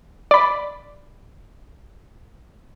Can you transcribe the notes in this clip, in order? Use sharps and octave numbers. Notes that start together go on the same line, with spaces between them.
D5 B5